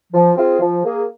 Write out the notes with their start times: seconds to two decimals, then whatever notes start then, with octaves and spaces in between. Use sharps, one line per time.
0.13 F3
0.36 C4 F4 G#4
0.60 F3
0.84 A#3 G#4